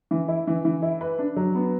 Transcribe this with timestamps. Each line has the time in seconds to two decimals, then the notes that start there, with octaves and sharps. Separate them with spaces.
0.11 E3
0.28 E4
0.47 E3
0.65 E3
0.82 E4
1.01 B4
1.19 D4
1.36 F#3
1.55 B3